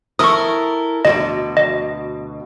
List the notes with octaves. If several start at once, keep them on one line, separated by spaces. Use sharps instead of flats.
E4 A4 A#4 C#6 D#6
D2 G#2 B2 D#5
D#5